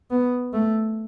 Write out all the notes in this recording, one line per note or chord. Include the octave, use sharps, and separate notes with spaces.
B3
A3